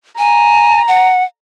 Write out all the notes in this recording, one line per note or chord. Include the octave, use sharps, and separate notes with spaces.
G#5 A#5
F#5